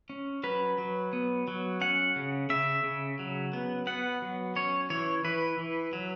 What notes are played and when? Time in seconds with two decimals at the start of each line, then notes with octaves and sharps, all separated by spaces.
0.10 C#4
0.43 F#3 B4
0.78 F#3
1.13 B3
1.48 F#3
1.81 C#4 F#5
2.16 C#3
2.50 C#3 E5
2.84 C#3
3.19 F#3
3.53 B3
3.87 B3 F#5
4.22 F#3
4.56 C#4 C#5
4.90 E3 C#5
5.24 E3 B4
5.59 E3
5.93 F#3